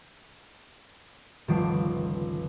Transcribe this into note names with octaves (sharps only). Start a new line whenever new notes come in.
G1 C#2 D#3 F3 D7